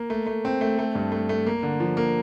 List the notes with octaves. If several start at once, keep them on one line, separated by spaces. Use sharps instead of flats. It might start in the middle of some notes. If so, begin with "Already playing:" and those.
Already playing: A#3
A3
A3
C4
A3
A3
G2
A3
A3
A#3
D3
F3
A#3